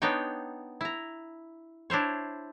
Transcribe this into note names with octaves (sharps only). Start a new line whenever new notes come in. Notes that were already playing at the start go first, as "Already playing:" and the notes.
B3 D4 D#4 C#5 G5
E4 A#5
D4 E4 C5 C#5